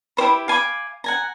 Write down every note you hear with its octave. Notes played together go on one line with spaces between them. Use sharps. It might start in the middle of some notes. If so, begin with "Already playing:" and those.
E4 G4 C5 B5
F5 G#5 B5 D6
F#5 G#5 A#5